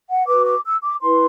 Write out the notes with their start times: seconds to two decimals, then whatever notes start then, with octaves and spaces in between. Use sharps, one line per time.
0.09 F#5
0.27 F#4 B4 D6
0.45 D6
0.64 E6
0.82 D6
1.01 E4 B4 C6